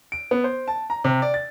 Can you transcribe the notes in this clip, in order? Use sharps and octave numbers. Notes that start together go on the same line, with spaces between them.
D7
B3
C5
A5
A#5
C3
D5
A6